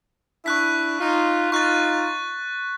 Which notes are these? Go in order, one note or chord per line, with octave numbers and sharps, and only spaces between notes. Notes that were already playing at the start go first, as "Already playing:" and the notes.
D4 E4 C#6 F#6 B6
D#4 F4
D#4 F4 C#6 F#6 A6